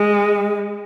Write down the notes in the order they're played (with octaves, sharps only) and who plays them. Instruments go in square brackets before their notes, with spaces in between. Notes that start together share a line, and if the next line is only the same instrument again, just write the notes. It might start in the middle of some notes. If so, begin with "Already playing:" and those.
Already playing: [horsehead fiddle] G#3